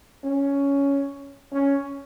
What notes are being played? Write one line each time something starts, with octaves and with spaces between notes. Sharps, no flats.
C#4
C#4